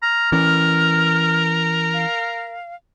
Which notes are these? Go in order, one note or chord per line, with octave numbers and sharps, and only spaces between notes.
A#5 F6
E3 C#4 A#4
F5